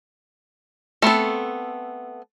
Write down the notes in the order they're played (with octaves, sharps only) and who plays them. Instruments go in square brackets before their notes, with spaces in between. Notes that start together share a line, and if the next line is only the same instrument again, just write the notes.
[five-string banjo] A3 B3 C4 A4